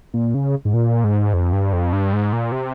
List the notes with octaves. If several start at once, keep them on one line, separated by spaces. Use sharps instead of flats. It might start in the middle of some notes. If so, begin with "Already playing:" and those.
A#2
C#3
G#2
A#2
G#2
F2
G2
F2
G2
G#2
A#2
C3